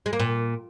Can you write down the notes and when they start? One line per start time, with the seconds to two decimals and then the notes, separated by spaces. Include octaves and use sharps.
0.06 G#3
0.13 A#3
0.20 A#2